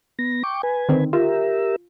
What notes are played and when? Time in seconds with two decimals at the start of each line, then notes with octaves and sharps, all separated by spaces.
0.19 B3 A#6
0.43 G5 C#6 D6
0.63 B4 G#5
0.89 D3 D#3 C4
1.13 F4 G4 A#4 E5